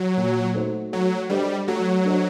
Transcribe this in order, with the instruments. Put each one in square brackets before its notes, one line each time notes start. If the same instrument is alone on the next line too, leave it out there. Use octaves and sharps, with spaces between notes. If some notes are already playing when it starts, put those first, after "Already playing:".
Already playing: [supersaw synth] F#3
[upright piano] A#2
A3 D#4 F#4 C5
[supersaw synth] F#3 [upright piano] A3
[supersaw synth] G3 [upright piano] D4 A4 C5 D#5
[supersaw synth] F#3 [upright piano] A3
[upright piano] D4 A4 C5 D#5